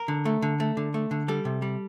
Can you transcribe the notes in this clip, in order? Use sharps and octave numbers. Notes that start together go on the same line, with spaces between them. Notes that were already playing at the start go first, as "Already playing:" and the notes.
Already playing: A#4
D3
A3
D3
A3
D3
A3
D3
G3 A4
C3
G3